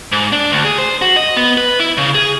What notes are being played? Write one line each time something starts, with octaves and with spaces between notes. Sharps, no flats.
G#2
D4
D2
G#4
C5
F#4
D#5
B3
B4
E4
C#3
G#4